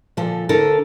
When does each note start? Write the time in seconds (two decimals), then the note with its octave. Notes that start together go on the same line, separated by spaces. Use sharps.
0.17 A#2 D3 F3 A4
0.49 D2 D3 A4 A#4